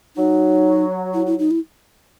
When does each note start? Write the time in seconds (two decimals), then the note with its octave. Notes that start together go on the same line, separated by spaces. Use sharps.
0.17 F#3 D#4
1.14 E4
1.27 E4
1.39 D#4
1.51 E4